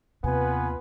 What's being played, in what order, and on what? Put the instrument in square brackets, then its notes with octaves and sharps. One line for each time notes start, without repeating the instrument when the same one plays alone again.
[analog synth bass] D#2 [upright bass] C3 [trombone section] B3 F4 B4 [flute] G#5